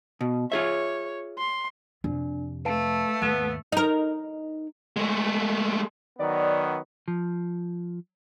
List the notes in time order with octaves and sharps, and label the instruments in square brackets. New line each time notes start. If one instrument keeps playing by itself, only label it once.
[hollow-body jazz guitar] B2
[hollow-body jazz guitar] F4 G#4 E5 [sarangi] C#5
[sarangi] C6
[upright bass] F2 C3 [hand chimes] D4
[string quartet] A3 [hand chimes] B4 F5 A5
[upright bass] D#2 G#2 [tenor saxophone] B3
[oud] D#4 A#4
[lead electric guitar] G#3 A3
[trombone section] D#3 F#3 B3 [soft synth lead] D5
[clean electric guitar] F3